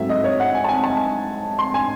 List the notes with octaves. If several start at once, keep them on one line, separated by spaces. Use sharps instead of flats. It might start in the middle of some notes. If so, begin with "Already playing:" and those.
Already playing: G#2 F#3 A3 C4 E5
D#5
C#5
F#5
G#5
A5
G#5
A5
C6
G#5